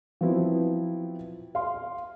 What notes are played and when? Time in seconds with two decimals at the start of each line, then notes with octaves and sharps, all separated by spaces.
0.21 F3 F#3 B3 C4 E4
1.55 F5 C6